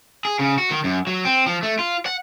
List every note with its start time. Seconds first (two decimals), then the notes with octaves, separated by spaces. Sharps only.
0.25 G#4
0.39 C#3
0.58 F#4
0.71 D#3
0.84 F#2
1.07 F#3
1.25 C4
1.46 F3
1.63 A3
1.79 F4
2.06 F#5